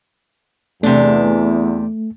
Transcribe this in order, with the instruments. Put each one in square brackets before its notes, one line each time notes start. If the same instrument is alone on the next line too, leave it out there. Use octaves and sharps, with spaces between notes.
[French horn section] E2 [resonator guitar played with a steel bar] C3 D4 [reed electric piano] A3